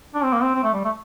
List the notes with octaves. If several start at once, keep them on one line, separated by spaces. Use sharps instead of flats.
D4
C4
A#3
C4
C4
A3
G3
A3